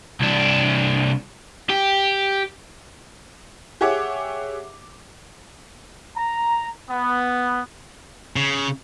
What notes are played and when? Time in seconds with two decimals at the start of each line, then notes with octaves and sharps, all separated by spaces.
0.21 C2 D4
1.70 G4
3.81 G4 G#4 C#5 E5 F#5 D6
6.17 A#5
6.89 B3
8.36 C#3